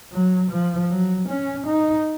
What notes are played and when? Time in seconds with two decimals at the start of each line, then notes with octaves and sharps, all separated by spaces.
0.13 F#3
0.51 F3
0.90 F#3
1.29 C#4
1.67 D#4